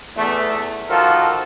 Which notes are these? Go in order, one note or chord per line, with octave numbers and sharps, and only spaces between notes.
E2 A3
D#3 F3 F4 F#4 A4 A#4